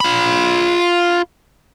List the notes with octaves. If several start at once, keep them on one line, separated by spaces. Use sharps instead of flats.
F4 B5